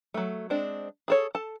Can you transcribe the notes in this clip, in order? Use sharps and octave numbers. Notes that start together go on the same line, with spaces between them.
F#3 A3
G#3 C4 D4
G#4 A4 C#5
A4 A5